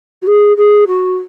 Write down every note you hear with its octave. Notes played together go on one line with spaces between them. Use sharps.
F#4
G#4
G#4
F#4